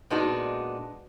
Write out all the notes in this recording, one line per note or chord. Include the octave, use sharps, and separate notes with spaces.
A#2 G#3 B3 D4 D#4 F#4